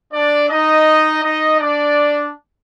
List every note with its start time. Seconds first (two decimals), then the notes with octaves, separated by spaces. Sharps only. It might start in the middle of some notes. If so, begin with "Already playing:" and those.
0.12 D4 D5
0.49 D#4 D#5
1.23 D#4 D#5
1.60 D4 D5